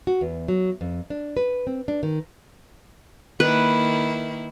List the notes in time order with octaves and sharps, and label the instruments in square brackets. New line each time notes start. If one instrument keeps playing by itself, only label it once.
[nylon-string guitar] F#4
E2
F#3
F2
D4
B4
C4
D4
D#3
[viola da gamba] D#3 A#3 E4 [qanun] B4